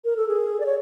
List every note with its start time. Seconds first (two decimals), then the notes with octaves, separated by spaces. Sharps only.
0.05 A#4
0.17 A4
0.28 G#4
0.60 D5
0.66 C#5